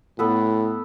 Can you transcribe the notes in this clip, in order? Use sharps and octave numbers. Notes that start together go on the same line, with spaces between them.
A2 B3 A4 B4